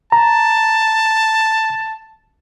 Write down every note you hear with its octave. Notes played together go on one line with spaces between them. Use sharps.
A5 A#5